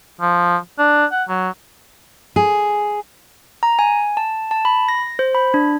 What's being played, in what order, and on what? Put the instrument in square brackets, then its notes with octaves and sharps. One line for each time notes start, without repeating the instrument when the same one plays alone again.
[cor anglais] F3
D4
F#5
F#3
[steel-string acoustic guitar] G#4
[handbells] A#5
G#5
A5
A5
B5
A#6
C5
B5
D4